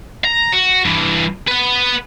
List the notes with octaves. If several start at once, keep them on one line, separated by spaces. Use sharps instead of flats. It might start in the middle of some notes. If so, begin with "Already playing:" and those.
A#5
F#4
G2 E3
B4 F#5